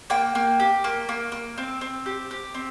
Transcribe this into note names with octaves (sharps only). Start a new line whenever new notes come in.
A#3 G5
A#3
G4
A#3
A#3
A#3
C4
C4
G4
G4
C4